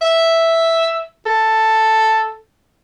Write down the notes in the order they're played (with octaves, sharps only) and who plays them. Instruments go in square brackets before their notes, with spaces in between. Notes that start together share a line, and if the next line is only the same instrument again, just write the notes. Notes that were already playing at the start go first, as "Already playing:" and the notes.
[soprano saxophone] E5
A4